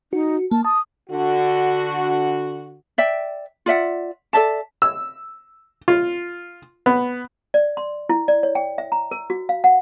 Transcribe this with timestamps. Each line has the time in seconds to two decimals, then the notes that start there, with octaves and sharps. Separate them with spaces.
0.13 D#4 F#4
0.51 A#3 A5
0.65 A5 D#6
1.10 D3 F#4
2.98 D5 E5 G5
3.66 F4 D5 E5 F#5
4.33 A4 D5 E5 A5
4.82 E6
5.88 F4
6.86 B3
7.54 D5
7.77 C6
8.09 E4
8.28 D5
8.43 C#5
8.55 G5
8.78 E5
8.92 A#5
9.11 A#4
9.30 F#4
9.49 F5
9.64 F#5